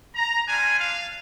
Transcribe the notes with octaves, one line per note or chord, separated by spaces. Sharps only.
A#5
G3 D4 F4 G#5
F5